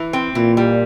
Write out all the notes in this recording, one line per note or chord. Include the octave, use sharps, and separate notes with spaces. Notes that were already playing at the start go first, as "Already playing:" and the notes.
Already playing: E3
C4
A#2 E3
G3